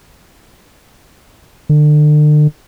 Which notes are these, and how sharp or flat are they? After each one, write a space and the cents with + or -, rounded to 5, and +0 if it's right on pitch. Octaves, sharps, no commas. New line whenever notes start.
D3 +35